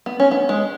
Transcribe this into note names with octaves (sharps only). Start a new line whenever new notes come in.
B3
C#4
B3
G#3